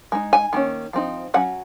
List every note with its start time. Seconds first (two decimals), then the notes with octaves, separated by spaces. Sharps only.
0.12 G#3 D#4
0.33 G#5
0.53 D#3 A#3 C#4
0.93 F3 C4 D#4
1.34 F#3 C#4 F#5